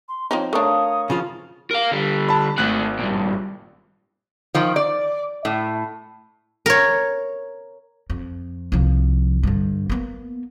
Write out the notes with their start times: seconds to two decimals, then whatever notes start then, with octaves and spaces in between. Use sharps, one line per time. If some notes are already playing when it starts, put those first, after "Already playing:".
0.09 C6
0.31 F3 C4 D#4 C#5
0.53 A3 D4 A#4 C#5 F5 D#6
1.10 C#3 F3 F4
1.71 A#4 F5
1.92 D3 G3
2.28 A5 B5
2.58 G#1 A3 F#5 F#6
2.99 G2 A#2
4.55 D#3 F3
4.76 D5
5.45 A2
6.66 A#4 C#5
8.10 F2
8.72 C2 F3
9.43 G2 D3
9.90 A#3 B3